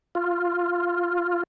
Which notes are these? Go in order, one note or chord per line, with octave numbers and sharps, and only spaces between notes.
F4